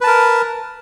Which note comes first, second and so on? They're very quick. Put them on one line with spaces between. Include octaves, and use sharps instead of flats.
B4 A5 A#4